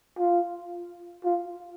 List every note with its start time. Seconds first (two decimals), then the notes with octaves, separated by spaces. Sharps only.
0.19 F4
1.25 F4